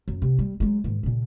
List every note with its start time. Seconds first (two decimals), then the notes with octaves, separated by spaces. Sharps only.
0.08 F#2
0.22 C3
0.39 G3
0.60 F#3 G#3
0.84 G#2 D#3
1.03 A#2 C#3